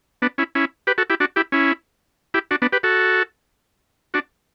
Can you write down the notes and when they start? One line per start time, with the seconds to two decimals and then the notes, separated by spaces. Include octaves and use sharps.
0.22 B3 D4
0.38 C#4 E4
0.55 C#4 E4
0.87 G4 B4
0.98 F#4 A4
1.10 E4 G4
1.20 D4 F#4
1.36 E4 G4
1.52 C#4 E4
2.34 E4 G4
2.51 D4 F#4
2.62 B3 D4
2.72 G4 B4
2.83 F#4 A4
4.14 D4 F#4